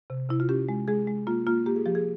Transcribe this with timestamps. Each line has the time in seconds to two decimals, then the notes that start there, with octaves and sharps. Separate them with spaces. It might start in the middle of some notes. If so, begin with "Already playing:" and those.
0.10 C3
0.29 C3 E4
0.40 F4
0.49 C#4 G4
0.69 G#3
0.88 G#3 G#4
1.07 G#3
1.27 A#3 F4
1.47 A#3 F4
1.66 A#3 G4
1.76 G#4
1.86 F3 G4
1.95 G#4